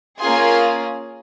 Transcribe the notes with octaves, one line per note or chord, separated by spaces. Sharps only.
A#3 C#4 F4 G#4 G#5 C6